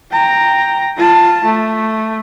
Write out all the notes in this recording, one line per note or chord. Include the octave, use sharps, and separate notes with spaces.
G5 A#5
F4 A5
A3